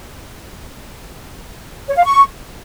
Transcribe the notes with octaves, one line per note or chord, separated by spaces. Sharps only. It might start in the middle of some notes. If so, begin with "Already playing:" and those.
C#5
F5
C#6